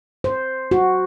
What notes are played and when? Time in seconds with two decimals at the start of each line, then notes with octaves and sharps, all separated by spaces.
0.24 C5
0.71 F#4